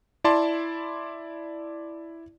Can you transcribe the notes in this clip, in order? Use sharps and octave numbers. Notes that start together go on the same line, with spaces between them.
E4 D5 A5 C6